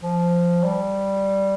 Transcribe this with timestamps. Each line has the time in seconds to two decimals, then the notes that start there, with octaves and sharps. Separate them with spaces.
0.03 F3
0.64 G3